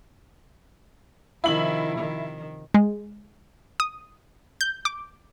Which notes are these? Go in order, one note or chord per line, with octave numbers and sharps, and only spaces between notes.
C3 D#3 F3 E4 F#7
D#3
G#3
D#6
G6
D6